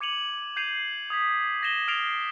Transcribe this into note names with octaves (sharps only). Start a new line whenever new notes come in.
D6 G#6 C#7 D#7 F7 F#7
G6 G#6 C7 D#7 F7
D#6 G#6 B6
G#6 A#6 D#7 E7 G7
F6 A6 C7 D7 F7 G7